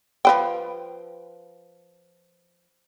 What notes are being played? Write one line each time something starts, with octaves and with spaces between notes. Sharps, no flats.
F3 B4 G5